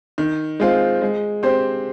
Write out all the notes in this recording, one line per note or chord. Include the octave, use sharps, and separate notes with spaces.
D#3
G#3 C4 F4
G#3
C4 G4 C5